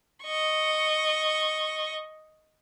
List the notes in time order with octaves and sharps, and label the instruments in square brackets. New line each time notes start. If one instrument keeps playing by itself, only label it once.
[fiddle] D#5 C#6